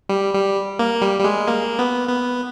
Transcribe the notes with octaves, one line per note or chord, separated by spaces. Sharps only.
G3
G3
A#3
G3
G3
G#3
A#3
B3
B3